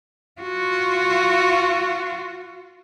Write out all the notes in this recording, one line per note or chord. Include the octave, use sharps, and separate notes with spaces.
F4 F#4